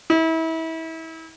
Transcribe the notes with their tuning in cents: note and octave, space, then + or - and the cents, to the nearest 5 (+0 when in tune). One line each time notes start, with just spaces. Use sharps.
E4 -30